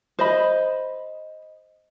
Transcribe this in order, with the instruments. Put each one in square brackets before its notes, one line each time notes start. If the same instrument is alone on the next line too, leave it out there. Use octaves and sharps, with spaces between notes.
[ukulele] C5 D#5 B5